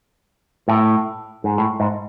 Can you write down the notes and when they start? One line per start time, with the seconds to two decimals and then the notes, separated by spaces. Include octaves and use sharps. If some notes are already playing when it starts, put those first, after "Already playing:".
0.68 A2
1.44 G#2
1.58 A2
1.80 G#2